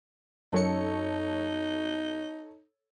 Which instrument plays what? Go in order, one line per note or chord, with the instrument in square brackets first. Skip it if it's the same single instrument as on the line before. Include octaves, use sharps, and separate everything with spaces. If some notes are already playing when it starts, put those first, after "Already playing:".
[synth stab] F#2 F#3 C#7 [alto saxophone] D#4 [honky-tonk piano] A4 C#5